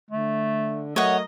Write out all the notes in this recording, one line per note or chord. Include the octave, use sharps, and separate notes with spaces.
D3 A3
F#3 A3 A#4 C#5 D#5 F#5